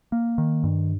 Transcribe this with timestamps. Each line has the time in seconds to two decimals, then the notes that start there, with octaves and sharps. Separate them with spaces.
0.12 A#3
0.38 D#3
0.64 G2